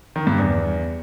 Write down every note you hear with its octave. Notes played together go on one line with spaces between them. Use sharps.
D#3
G2
E2